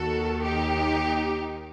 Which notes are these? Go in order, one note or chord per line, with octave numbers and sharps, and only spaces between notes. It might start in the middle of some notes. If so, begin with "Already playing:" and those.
Already playing: D#2 D#3 F#4 A4
D#4 G4